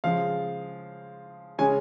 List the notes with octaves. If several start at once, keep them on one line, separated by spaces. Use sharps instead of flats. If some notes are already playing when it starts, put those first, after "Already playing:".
C#3 F3 G#3 F5
C#3 G#3 C#4 G#5